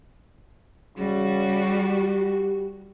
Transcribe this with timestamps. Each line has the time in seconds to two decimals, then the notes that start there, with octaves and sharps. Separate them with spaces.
0.98 C#3 G3 F#4
1.84 G4